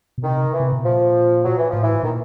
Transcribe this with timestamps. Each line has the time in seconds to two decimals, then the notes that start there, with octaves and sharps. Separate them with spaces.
0.18 B2
0.23 C3 D#3
0.54 E3
0.60 C3
0.72 B2
0.84 A#2 F3
1.44 F#3
1.58 E3
1.71 A2 F3
1.82 E3
2.03 A#2 D#3